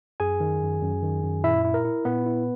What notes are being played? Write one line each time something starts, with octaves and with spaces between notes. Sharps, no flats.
F#2 G#4 G#5
D#3
F#2
F#2
D#3
F#2
A#2 E4 E5
E4
A#4
E4
A#2 B3 B4
E4